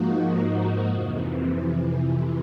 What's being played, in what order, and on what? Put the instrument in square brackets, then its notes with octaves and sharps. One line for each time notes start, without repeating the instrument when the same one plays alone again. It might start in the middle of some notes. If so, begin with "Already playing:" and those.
Already playing: [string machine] G#2 F3 A#3 D#4 F#4
F2 C3 E3